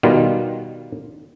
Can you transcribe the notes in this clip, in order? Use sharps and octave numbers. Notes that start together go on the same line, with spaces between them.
B2 D#3 G3 F4